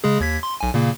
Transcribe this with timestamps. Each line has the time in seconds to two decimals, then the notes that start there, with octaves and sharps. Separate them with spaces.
0.04 C#3 G#3 G#4
0.20 D#2 G#6 B6
0.43 C6
0.61 B1 G#5
0.74 A#2 C#3 A#3